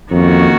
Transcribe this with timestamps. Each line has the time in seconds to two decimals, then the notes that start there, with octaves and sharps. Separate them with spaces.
0.11 F2 D#3 A#3 C#4 F#4